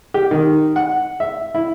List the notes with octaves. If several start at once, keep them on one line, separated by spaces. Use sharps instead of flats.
G4
D#3
F#5
E5
E4